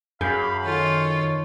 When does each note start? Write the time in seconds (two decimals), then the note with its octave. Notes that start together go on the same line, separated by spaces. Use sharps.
0.21 F#2 G#4 F5 B5 G6
0.63 D#3 F4 A4 C#5